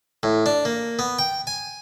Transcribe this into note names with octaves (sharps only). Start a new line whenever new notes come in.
A2
D4
A#3
B3
G5
G#5